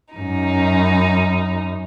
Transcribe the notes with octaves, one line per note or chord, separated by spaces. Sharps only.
F#2 D#4